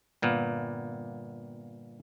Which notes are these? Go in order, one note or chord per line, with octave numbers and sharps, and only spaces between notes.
G1 A#2 A#3 B3